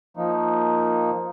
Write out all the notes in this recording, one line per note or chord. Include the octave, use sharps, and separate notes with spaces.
F3 A#3 D#4